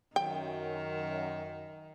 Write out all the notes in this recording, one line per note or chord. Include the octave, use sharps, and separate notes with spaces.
F#2 D#3 G5